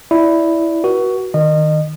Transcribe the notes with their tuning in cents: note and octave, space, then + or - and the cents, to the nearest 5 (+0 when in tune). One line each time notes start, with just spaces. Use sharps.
E4 +0 D5 -10
F#4 +15 B4 -40
D#3 +0 D#5 -30